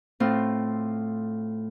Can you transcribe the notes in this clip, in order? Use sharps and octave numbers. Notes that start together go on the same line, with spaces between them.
A2 C4 F4